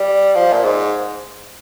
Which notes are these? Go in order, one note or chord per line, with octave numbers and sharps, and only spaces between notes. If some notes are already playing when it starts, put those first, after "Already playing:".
Already playing: G3
F3
A#2
G#2